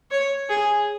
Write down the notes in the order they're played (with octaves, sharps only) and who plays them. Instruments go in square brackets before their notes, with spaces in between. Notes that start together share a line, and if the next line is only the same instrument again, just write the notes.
[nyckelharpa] C#5
G#4